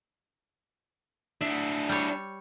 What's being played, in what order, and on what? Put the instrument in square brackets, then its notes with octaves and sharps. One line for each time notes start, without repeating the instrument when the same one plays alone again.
[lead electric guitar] D4 E4 [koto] E5
[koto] G3 C#5